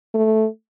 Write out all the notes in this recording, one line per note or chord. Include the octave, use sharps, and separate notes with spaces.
A3